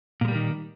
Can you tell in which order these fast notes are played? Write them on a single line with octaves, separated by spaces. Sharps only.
A#2 G#3 G3 A#3 D#3